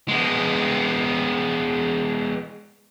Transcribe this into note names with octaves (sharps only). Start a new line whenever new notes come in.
G#3 B3